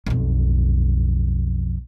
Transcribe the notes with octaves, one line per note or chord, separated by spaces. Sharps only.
B1 F2